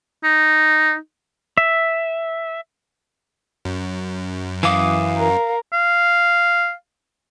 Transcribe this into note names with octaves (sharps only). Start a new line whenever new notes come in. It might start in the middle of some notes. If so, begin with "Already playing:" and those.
D#4
E5
F#2
E3 F5 D6 D#6
A#4
F5